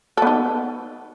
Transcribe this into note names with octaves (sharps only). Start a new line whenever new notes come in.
B3 D#4 A4